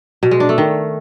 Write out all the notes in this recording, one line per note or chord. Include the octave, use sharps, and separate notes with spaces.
B2
G#3
D4
A3
D#3